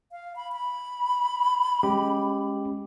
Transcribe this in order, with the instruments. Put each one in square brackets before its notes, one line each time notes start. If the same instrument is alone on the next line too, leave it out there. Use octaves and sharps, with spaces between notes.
[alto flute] F5
B5
B5
[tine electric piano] G#3 C#4 G4